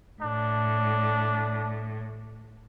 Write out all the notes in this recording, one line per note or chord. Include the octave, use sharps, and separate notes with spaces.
A2 D4